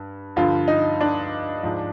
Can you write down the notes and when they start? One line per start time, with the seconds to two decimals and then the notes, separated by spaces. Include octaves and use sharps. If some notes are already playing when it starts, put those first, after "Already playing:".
Already playing: G2
0.36 G2 D3 F3 F4
0.68 D#4
1.01 D4
1.63 G#2 F3